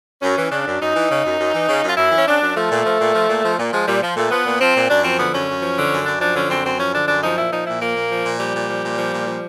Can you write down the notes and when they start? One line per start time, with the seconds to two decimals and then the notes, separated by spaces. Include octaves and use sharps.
0.22 F#2 C#4
0.37 E3
0.51 C#3 D4
0.66 F#2
0.80 F#2 D#4
0.95 E3
1.09 C#3
1.24 F#2
1.39 F#2
1.53 E3
1.67 C#3
1.83 F#2 F4
1.97 F#2 E4
2.11 E3
2.17 C#4
2.26 C#3 D4
2.41 F#2
2.55 F3 A3
2.70 A#2
2.84 F3
2.99 A#2
3.14 F3
3.28 A#2
3.43 F3
3.58 A#2
3.72 F3 G#3
3.86 A#2 G3
4.02 F3
4.16 A#2 A3
4.30 F3 B3
4.45 A#2
4.60 F3 C4
4.74 A#2
4.89 F#2 D4
5.03 F3 C4
5.18 D3 B3
5.32 F#2 C#4
5.48 F#2
5.62 F3
5.76 D3
5.92 F#2
6.06 F#2 D4
6.20 F3 D4
6.35 D3 C#4
6.49 F#2 C4
6.64 F#2 C4
6.78 F3 C#4
6.93 D3 D4
7.07 F#2 D4
7.22 F3 D#4
7.37 A#2 E4
7.52 F3 D#4
7.66 A#2 E4
7.81 F3 A#3
7.95 A#2
8.10 F3
8.25 A#2
8.39 F3 G3
8.54 A#2
8.68 F3
8.83 A#2
8.98 F3
9.12 A#2
9.27 F3